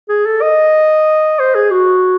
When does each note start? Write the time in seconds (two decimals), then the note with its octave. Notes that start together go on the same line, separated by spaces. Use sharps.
0.09 G#4
0.26 A4
0.42 D#5
1.39 C5
1.55 G#4
1.71 F#4